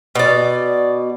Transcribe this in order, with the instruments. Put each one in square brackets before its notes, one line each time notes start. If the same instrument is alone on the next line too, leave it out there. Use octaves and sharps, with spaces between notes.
[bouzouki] B2 D5